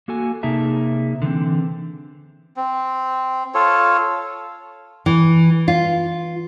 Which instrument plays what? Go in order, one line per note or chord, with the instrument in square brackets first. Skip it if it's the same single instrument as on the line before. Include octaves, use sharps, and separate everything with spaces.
[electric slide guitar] A#3 F#4 A4 G#5
C3 A#3 D#4 G#4 E5 A5
D3 E3 B3 C4
[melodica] C4
F4 A4 C#5
[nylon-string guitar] E3
F4